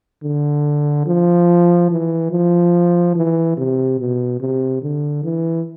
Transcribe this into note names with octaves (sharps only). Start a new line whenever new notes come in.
D3
F3
E3
F3
E3
C3
B2
C3
D3
E3